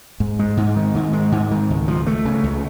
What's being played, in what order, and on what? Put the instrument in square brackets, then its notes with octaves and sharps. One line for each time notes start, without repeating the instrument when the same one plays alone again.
[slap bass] G#2
G#3
G#2
D#3
G#2
G#3
G#2
D#3
C#2
F3
A3
C#3
C#2